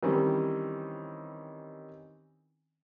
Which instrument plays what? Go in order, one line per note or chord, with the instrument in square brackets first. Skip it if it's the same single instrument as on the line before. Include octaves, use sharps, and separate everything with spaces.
[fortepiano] D#3 E3 G3 C4 C#4